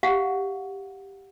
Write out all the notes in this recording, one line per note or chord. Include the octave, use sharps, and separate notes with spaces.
G4 F5 F#5